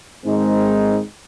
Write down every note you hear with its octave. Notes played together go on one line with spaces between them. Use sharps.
G#2 D#3 G#3 C4 D#4